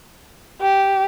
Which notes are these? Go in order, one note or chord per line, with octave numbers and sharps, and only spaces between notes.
G4